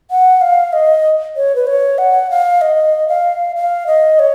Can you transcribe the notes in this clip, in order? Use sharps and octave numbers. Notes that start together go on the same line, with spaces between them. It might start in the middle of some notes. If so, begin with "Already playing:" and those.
F#5
F5
D#5
C#5
B4
C#5
F#5
F5
D#5
F5
F5
D#5
C#5